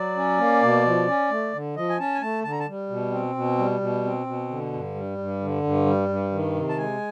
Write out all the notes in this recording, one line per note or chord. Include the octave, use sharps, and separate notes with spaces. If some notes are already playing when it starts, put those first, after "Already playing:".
Already playing: F#3 D5
C#4
A#3
B2
F3
C#4
A3
D3
F3 D#5
G#5
C#4 A5
G#5
A3 A5
D3 A5
A#5
A5
G3
B2
C4
B2
G3
B2
C4
B2
D3
G2
G3
G2
D3
G2
G3
G2
D#3
C3
A5
G#3 G#5